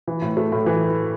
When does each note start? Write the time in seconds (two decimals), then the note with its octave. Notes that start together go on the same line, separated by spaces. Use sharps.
0.08 E3
0.22 A2
0.37 A3
0.52 A2
0.66 E3